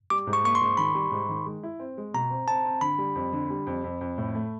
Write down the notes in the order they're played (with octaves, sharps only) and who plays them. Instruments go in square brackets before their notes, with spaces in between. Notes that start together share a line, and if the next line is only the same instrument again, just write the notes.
[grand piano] G3 [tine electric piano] D6
[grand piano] G#2
[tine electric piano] C#6
[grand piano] A#3 [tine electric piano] C#6
[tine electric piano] C6
[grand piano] G#2
[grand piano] D#3 [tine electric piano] B5
[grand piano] G3
G#2
D#3
G#3
E4
C4
G#3
[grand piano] B2 [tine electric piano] A#5
[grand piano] C4
[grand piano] C4 [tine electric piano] A5
[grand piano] C4
[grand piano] D3 [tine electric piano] B5
[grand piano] G3
F2
D3
G3
F2
F2
F2
A2
A3